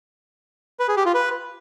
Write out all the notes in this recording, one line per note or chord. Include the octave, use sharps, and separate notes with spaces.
B4
G#4
G4
F4
B4